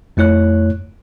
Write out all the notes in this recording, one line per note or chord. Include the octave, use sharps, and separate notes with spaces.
F2 A3 E4 C#5 F#6